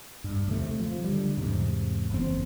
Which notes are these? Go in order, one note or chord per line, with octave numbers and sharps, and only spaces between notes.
G2
D#2 C3 A3
F3
D3 G3
E2 G#2 C3
F#1 E2 C4